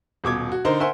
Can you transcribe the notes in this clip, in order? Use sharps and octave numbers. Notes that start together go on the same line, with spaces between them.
D#1 B2 D6 G#6
F#4
D3 D#4 A#4 C5
A#4 C5 E5 F#5 G#5 C6